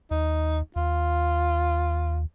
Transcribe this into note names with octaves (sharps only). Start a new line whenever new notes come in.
D#2 D#4
D#2 F4